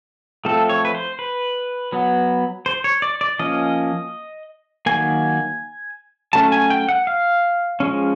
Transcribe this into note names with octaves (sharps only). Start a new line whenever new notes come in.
F3 A3 C4 A4
C#5
B4
C5
B4
F#3 B3
C5
C#5
D5
D5
F3 A#3 C#4 D#5
D#3 F#3 A#3 G#5
F#3 A3 C#4 A5
G#5
G5
F#5
F5
F3 G#3 C#4